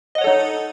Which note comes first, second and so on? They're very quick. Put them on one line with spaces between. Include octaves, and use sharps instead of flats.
D#5 F#5 C#5 A4 D#4